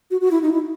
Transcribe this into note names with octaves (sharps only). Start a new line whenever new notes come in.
F#4
F#4
E4
D#4
E4